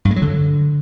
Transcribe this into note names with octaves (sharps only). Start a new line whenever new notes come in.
G2
G#3
F#3
D3